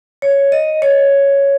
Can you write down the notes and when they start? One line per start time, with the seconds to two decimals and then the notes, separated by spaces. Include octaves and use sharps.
0.22 C#5
0.52 D#5
0.82 C#5